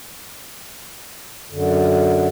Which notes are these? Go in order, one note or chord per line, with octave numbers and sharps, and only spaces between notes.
F#2 D3